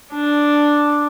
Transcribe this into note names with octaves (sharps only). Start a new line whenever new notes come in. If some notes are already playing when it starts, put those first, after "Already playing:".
D4